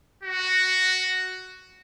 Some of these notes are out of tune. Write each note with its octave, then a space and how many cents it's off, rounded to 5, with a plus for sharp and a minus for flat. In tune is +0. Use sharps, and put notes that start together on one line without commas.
F#4 +5